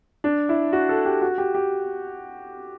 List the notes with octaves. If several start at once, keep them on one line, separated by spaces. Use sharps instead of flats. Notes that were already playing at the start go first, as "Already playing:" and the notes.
D4
E4
F#4
A4
G4
F#4
G4
G4